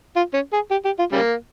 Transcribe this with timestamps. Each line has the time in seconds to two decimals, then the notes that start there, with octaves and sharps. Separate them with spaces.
0.16 F4
0.33 C#4
0.53 G#4
0.71 G4
0.85 G4
0.99 F4
1.12 C#3 G3 A#3